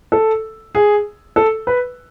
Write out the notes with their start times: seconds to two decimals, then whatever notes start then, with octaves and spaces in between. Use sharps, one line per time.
0.12 A4
0.75 G#4
1.36 A4
1.67 B4